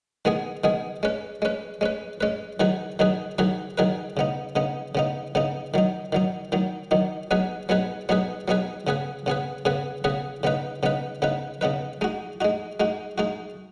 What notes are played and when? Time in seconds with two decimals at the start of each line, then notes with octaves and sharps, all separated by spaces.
0.25 D#3 G#3 B3 G#4
0.64 D#3 G#3 B3 G#4
1.03 G#3 C#4 B4
1.42 G#3 C#4 B4
1.81 G#3 C#4 B4
2.21 G#3 C#4 B4
2.60 D#3 F#3 D#4 G#4 B4
2.99 D#3 F#3 D#4 G#4 B4
3.38 D#3 F#3 D#4 G#4 B4
3.78 D#3 F#3 D#4 G#4 B4
4.17 C#3 B3 D#4
4.56 C#3 B3 D#4
4.95 C#3 B3 D#4
5.35 C#3 B3 D#4
5.74 D#3 F#3 D#4
6.12 D#3 F#3 D#4
6.52 D#3 F#3 D#4
6.91 D#3 F#3 D#4
7.31 F#3 B3 D#4 G#4 B4
7.69 F#3 B3 D#4 G#4 B4
8.09 F#3 B3 D#4 G#4 B4
8.48 F#3 B3 D#4 G#4 B4
8.87 C#3 B3 G#4 B4
9.26 C#3 B3 G#4 B4
9.65 C#3 B3 G#4 B4
10.04 C#3 B3 G#4 B4
10.43 C#3 B3 D#4 B4
10.83 C#3 B3 D#4 B4
11.22 C#3 B3 D#4 B4
11.61 C#3 B3 D#4 B4
12.01 G#3 D#4 F#4
12.41 G#3 D#4 F#4
12.80 G#3 D#4 F#4
13.18 G#3 D#4 F#4